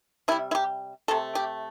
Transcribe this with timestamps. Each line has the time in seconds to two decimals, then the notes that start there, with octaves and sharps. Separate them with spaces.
0.28 C3 E4
0.32 G3
0.51 E4
0.55 G4
1.08 C3 A3 A4
1.35 G4